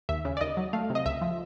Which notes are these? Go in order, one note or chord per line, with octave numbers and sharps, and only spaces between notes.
D#2 E5
C#3
D5
D#2 D#5
F#3
A3 F5
C3
D#5
C#2 E5
F3